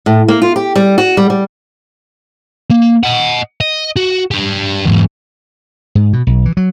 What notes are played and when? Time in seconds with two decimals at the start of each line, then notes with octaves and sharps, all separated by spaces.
0.06 A2
0.28 A#3
0.42 F4
0.56 G4
0.75 G3
0.98 F#4
1.17 G3
1.30 G3
2.71 A#3
3.04 D#5 F#5
3.61 D#5
3.96 F#4
4.31 D4 G4
4.85 E2 G#2
5.95 G#2
6.13 B2
6.27 B1
6.45 E3
6.57 F#3